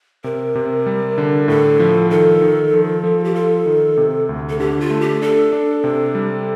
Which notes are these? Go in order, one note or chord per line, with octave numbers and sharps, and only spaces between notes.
C3 A#4
C3
G3
D3
A2 A4
F3
D#3 A4
D#3
F3
F3
G4
F4 A4
D#3
C3
D2
A4
D3 G4
F4
A3
G4
D4 A4
D4
C3
G3